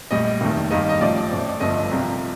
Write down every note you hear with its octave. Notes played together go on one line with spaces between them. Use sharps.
A#1 A2 G3 D#5
F1 D#2 D#3 A3
G2 D#3 G3 A#3 D#5
D#5
A1 A2 F3 A3 D5
A1 A2 A3 C4
G1 G2 F3 A3 D#5
C2 C3 F3